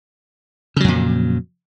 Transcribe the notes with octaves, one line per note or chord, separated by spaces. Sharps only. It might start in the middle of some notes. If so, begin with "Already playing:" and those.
F2 A#2 C#3 F#3